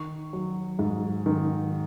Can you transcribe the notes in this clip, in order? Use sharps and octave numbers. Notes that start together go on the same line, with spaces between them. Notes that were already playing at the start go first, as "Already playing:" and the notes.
Already playing: D#3 C#6
F#3
G#2
D#3